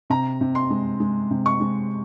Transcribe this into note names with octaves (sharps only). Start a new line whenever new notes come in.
C3 A#5
C3
C6
G#3
G#3
C3
C#6
G#3